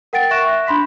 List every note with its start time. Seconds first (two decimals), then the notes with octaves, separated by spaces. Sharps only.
0.13 A#4 F#5 G5 A6 D7
0.31 E5 C#6 F#6 A#6 E7
0.67 D4 B5 C6 B6